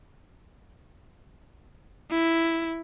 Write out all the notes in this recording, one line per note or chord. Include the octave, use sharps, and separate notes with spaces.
E4